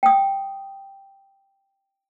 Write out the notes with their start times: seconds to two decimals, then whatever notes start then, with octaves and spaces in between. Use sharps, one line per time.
0.03 G5 D#6